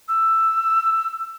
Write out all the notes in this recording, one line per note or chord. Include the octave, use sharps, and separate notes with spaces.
E6